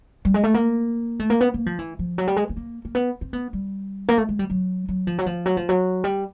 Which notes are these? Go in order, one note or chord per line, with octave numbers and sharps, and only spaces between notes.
G3
G#3
A3
A#3
A3
A#3
B3
A#3
F3
E3
F3
F#3
G3
G#3
B3
A#3
A#3
B3
C4
B3
G3
A#3
A3
G#3
G3
F#3
F#3
F3
F#3
F3
F#3
F3
F#3
G3